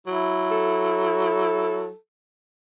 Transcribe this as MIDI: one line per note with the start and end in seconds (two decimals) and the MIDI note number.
0.07 1.89 54
0.07 1.91 64
0.51 1.96 69